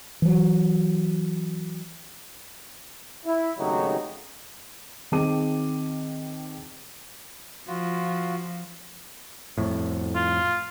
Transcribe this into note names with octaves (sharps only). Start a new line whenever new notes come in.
E3 F#3
E4
G#1 C#3 F#3 A3 D#4 G4
D#3 C4 G#4 A5 D6 D#7
F3 F4 F#4
F2 A2
F4